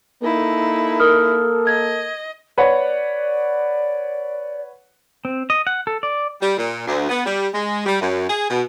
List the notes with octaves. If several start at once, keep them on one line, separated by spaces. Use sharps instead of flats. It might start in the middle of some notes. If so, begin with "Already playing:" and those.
A#3 D#4 E4 A4
A#4 D#6 F6
D#5 G#6
B4 C#5 D5 F#5
C4
D#5
F#5
A4
D5
G3
A#2
D2
B3
G3
G#3
G3
F#2
G#4
B2